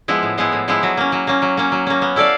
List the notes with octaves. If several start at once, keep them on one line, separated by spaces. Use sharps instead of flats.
F3 G#3 B3 E4
A2
F3 G#3 B3 E4
A2
F3 G#3 B3 E4
F#3
A#3 C#4
F#3
A#3 C#4
F#3
A#3 C#4
F#3
A#3 C#4
B3
E4 A4 D5 F5